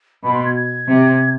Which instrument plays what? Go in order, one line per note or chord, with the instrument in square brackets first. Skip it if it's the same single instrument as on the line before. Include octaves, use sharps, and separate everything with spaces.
[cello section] B2 [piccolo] B5
[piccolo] C6
G#6
G#6
[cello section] C3